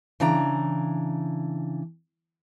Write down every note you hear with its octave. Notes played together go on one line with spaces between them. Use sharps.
C#3 E3 D4 A#5